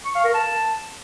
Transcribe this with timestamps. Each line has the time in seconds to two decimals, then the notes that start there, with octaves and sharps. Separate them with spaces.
0.05 C#6
0.15 F5
0.24 A#4
0.34 A5